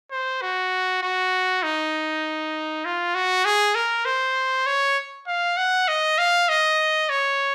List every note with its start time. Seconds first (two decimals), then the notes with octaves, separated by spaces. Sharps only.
0.11 C5
0.41 F#4
1.02 F#4
1.63 D#4
2.85 F4
3.15 F#4
3.45 G#4
3.75 A#4
4.05 C5
4.66 C#5
5.27 F5
5.57 F#5
5.88 D#5
6.18 F5
6.49 D#5
7.09 C#5